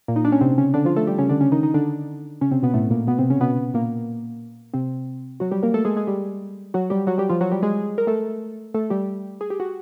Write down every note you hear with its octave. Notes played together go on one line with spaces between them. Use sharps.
A#2 A#3
D#4
D4
C#4
C3 C4
C#3 C#4
D3 D4
F3 F4
A3 A4
G3 G4
C#3 C#4
D3 D4
C#3 C#4
D#3 D#4
D#3 D#4
D3 D4
C#3 C#4
C3 C4
B2 B3
A2 A3
A#2 A#3
B2 B3
C3 C4
C#3 C#4
B2 B3
A#2 A#3
C3 C4
F#3 F#4
G3 G4
A#3 A#4
A3 A4
G#3 G#4
G#3 G#4
G3 G4
F#3 F#4
G3 G4
F#3 F#4
G3 G4
F3 F4
F#3 F#4
G3 G4
G#3 G#4
A#4
A3 A4
A3 A4
G3 G4
G#4
G4
F#4